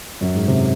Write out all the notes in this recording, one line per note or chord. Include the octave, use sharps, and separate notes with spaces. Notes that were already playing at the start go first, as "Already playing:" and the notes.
F#2
G#2
C3